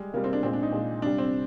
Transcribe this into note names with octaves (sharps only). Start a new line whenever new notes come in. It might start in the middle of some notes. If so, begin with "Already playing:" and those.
Already playing: G3 G#3
C3 G3 A#3
C4
D4
A#2 G#3 C4
D4
D#4
A#2 G#3
C3 G3 D4
C4